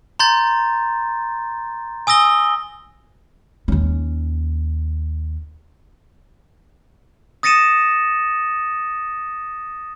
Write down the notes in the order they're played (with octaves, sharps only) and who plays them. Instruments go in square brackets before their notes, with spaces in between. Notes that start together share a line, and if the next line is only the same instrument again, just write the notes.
[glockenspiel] A#5 C6 G6 A6
G#5 D#6 E6 A#6 G7
[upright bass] D#2 C#4
[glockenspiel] D#6 A6 A#6 C#7 D#7 E7